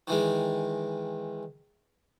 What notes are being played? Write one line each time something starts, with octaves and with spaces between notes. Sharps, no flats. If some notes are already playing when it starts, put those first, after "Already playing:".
D#3 E3 G#3